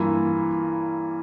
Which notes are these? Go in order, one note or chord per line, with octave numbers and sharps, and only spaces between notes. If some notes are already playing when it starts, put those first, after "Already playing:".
Already playing: G2 E3 A#3 F4